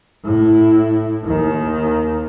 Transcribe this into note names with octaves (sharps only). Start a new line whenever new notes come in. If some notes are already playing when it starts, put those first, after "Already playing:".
A2 E4
D#2 D#3